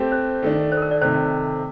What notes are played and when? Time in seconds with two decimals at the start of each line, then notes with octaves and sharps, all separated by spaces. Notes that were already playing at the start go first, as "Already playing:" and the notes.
Already playing: A3 C4 G4
0.12 C5
0.42 D#3 A3 D4
0.72 C5
0.77 A4
0.82 A#4
0.91 D5
1.01 C3 D#3 A3 C5